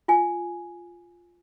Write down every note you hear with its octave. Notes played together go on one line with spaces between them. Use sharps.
F4 G#5